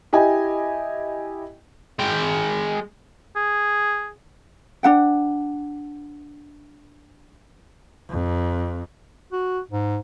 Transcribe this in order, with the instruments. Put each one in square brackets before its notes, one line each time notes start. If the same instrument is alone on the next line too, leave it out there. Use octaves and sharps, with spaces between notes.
[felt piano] E4 G4 D#5 G5 G#5
[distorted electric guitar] G#3 G5
[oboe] G#4
[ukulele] D4 D#4 F#5 G5
[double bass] F2
[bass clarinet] F#4
G#2